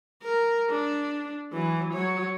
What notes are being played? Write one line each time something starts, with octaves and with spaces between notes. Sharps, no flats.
A#4
D4
E3 F#3
F#3 C#5